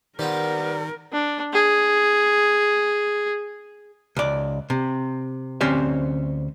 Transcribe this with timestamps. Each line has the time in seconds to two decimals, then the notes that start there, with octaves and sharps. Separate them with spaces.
0.19 D#3 G3 B3 F4 A#4 C5
1.12 D4
1.53 G#4
4.16 C#2 D5
4.70 C3
5.61 D2 C4 C#4 G4 C5 D5